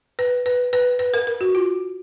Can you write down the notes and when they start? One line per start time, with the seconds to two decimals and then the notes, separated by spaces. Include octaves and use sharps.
0.19 B4
0.46 B4
0.73 B4
0.99 B4
1.14 A#4
1.27 A#4
1.41 F#4
1.55 F4